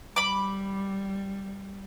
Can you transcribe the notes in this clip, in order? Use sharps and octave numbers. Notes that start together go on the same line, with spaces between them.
G3 B5 D6